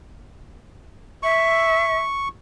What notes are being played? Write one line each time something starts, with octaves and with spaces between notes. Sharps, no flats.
E5 C#6